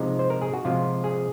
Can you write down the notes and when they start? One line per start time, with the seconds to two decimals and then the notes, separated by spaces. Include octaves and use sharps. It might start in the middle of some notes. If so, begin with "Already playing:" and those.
Already playing: C3 F3 G#3 D#4
0.19 C5
0.30 A#4
0.42 G#4
0.53 F#4
0.65 C3 F3 G#3 F4
1.04 G#4